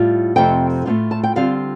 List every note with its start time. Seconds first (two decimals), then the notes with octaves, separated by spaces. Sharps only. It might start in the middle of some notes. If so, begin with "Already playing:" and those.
Already playing: A2 G3 F4
0.36 F2 C3 A3 C4 G5
0.86 A2 A3 C4 F4
1.11 A5
1.23 G5
1.36 D3 G3 C4 F4 F5